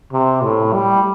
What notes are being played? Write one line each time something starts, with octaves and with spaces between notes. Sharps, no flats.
C3
A2
G3